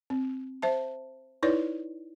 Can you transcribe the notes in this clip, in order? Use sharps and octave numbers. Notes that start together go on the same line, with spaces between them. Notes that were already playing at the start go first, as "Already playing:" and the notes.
C4
C5 E5 A5
D#4 E4 B4 C#5 D5